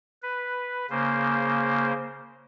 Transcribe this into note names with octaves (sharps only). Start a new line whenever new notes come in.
B4
C#3 A#3 C5